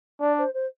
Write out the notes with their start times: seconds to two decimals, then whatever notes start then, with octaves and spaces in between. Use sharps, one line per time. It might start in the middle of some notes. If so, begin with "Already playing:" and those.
0.20 D4 D5
0.38 C5
0.54 C5